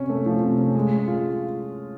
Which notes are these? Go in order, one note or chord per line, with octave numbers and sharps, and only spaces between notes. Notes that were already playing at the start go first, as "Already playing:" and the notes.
Already playing: C3 C#4
A3
F3
C3
C#4
G#3
G#3
F4